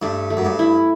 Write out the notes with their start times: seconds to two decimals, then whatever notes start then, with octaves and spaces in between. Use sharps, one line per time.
0.02 G2 A3
0.30 A3
0.37 F#2
0.45 G2
0.59 E4